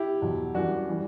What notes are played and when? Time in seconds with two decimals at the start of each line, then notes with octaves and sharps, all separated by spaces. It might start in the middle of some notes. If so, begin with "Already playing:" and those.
Already playing: E4 G4
0.21 E2 B2 F#3
0.54 F#2 E3 G3 D4 F#4
0.89 E3 G3